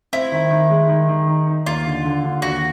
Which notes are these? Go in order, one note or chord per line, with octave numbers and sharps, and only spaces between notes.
C4 E4
D#3
D#3
G#3
D#3
D#3
D#4
D#4
D#2 F4
D3
D3
D3
D#2 F#4